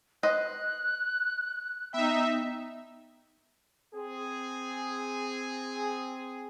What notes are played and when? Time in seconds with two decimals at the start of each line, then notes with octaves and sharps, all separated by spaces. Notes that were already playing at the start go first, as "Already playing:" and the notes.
0.23 B4 C5 D#5 F#6
1.93 B3 D#4 E5 G5
3.94 C4 G#4